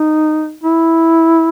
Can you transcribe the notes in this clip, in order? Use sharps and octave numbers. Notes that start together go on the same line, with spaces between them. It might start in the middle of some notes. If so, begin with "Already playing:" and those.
Already playing: D#4
E4